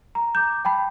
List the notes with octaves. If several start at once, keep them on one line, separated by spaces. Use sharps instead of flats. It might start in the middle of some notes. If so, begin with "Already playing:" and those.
A#5
A#5 D6 G6
G5 A5 B5